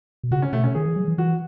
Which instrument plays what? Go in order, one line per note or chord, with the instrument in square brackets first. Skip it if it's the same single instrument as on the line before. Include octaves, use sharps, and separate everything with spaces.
[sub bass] B2
[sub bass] C#3 [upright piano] F#4
[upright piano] C#4
[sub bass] B2 [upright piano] A3
[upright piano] C#4
[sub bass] D#3 [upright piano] G#4
[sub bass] E3
F#3
E3
[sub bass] E3 [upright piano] F#4